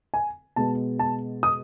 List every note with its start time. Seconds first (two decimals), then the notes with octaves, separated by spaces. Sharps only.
0.14 G#5
0.56 B2 G#3 B3 A5
0.99 A5
1.43 D#6